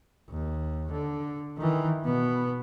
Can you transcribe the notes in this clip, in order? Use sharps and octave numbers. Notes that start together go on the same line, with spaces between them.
D#2
D3
D#3 E3
B2 B3